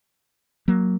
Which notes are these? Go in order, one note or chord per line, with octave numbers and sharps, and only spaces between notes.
F#3 A#3